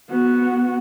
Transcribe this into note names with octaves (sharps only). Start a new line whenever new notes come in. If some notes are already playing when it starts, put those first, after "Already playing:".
B3 F#4